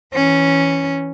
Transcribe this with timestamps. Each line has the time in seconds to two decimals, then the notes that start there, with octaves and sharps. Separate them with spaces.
0.14 E3 C#4